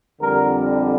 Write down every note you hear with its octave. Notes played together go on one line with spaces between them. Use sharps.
F2 D3 G3 A#4